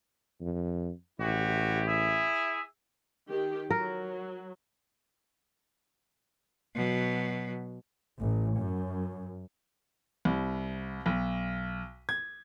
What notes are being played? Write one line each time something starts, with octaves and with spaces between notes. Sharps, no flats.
F2
A1 E4 F#4 G4
E4 G#4 E5
D#3 G4
F#3 A#4
B2 F#3
A1
F#2
C2
B1
G#6